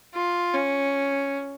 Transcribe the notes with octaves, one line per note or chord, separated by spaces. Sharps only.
F4
C#4